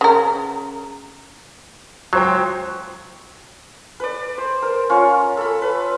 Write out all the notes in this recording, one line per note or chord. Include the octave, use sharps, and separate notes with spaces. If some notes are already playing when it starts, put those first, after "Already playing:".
C#3 A#4
C#2 F#3 C5 G5
B4 D5
C5
A#4
C#4 F4 C#6
A4 B5
B4